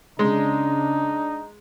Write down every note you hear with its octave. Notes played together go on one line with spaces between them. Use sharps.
C#3 G#3 D4 D#4